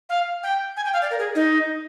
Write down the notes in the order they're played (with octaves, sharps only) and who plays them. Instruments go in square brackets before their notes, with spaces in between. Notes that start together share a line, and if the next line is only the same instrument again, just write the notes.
[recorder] F5
G5
G#5
G5
F5
D5
A#4
G#4
D#4